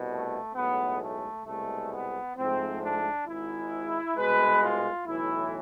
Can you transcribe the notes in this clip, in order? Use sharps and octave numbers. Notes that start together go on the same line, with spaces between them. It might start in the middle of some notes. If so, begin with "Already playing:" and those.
Already playing: C2 B2
A3
B1 A2 G#3 B3
A3
C2 B2 G#3 A3
B3
G#2 F3 A3 C4
D4
G#1 G#2 G#3 E4
C2 B2 G#3 B4
F4
B1 A2 E3 E4